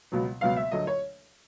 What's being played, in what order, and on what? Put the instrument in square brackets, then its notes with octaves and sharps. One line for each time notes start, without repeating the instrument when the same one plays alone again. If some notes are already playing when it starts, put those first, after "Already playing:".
[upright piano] C#2 B2 F#3 B3
C#2 B2 F#3 B3 F5
E5
D2 D3 F#3 A3 D#5
C#5